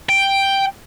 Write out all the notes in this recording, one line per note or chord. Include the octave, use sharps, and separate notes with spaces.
G5